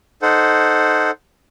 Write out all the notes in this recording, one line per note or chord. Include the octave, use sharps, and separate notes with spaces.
D#4 A4 C5 F#5